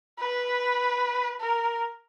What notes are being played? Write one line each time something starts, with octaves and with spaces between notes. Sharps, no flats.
B4
A#4